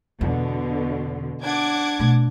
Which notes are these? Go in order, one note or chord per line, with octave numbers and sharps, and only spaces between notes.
E2 B2 D3
D4 F#5 D6 G#6
B2 A3